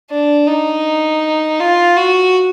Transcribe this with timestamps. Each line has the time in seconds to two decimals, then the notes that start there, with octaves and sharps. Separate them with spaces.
0.11 D4
0.47 D#4
1.60 F4
1.96 F#4